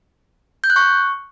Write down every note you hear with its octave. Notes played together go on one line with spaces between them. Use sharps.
G6
F#6
C#6